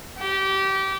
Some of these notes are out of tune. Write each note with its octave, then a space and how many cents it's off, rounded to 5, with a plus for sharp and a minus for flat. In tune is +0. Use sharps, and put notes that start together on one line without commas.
G4 -25